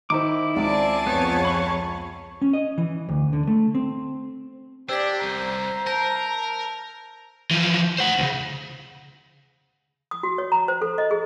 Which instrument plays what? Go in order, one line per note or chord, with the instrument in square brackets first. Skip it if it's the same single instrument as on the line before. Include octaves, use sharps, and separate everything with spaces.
[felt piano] D#3 D#4 C5 [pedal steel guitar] E4 D6
[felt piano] C#2 [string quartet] C4 G#4 A5 [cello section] D5
[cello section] F2 C#5 [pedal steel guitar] B3
[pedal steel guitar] B5 C#6
[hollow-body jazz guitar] C#4
D#5
E3
D2
D3
A3
C4
[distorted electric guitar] D4 [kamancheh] G4 D5 [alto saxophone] C5 [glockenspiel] E6 G#6 B6
[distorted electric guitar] C2 [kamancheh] A#5
[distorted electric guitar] A#4 [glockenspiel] A5 G6 A#6
[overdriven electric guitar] E3 F3
C5 F#5
C#2 C#3
[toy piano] D#6
F#4
C#5
A#5
C5
A4
D#5
G#4